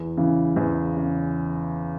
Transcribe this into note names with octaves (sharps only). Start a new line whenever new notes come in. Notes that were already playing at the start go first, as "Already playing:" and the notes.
Already playing: E2
C#3 E3
E2
C#3